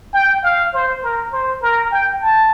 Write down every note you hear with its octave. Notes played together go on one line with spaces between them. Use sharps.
G5
F5
C5
A#4
C5
A#4
G5
A5